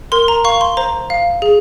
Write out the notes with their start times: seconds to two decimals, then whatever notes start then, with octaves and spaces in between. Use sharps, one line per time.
0.12 A#4 C6
0.28 A#5
0.44 F5 C#6
0.61 C6
0.77 C5 A#5
1.10 F5
1.42 G#4